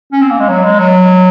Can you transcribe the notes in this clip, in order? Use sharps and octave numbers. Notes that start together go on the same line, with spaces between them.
C#4
C4
A#3
G#3
F#3
G#3
F#3